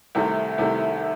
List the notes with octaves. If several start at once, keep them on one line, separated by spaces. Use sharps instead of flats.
C2 C3 D#3 A3
C2 C3 D#3 A3